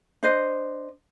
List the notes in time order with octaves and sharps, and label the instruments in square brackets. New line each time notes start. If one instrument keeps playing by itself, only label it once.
[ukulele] D4 C5 D#5